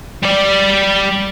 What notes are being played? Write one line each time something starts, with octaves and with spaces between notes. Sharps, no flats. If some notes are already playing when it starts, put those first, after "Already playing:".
G3 D5